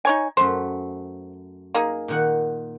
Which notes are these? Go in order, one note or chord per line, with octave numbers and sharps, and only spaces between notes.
D#4 C#5 G#5
F#2 A3 C5
A#3 D#4 G#4
A#2 D#3 F#5